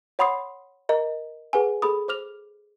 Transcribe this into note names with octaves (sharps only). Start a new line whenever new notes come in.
C#5 F#5 B5 C6 D#6 C7
A#4 D#5 A#5
G#4 B4 F#5 G#5
G#4 A4 B5 D#6
C5 D6 F6 F7